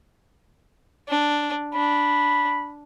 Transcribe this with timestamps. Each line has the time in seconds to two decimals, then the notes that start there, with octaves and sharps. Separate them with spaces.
1.08 D4
1.74 D4 B5